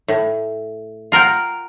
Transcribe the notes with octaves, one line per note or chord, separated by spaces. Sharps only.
A2
F4 A#4 F#5 G5